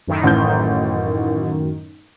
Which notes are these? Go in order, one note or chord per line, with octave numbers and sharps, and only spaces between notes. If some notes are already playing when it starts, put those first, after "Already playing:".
F#2 A2 D#3
A1 G6